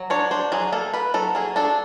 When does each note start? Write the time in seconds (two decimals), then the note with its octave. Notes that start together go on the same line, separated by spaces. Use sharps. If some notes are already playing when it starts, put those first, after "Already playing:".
Already playing: F#3
0.10 D4 C#5
0.31 D4 C5
0.52 F#3 G#4
0.72 A#3 A4
0.94 A#3 B4
1.14 F#3 A4
1.35 A#3 G#4
1.56 D4 A4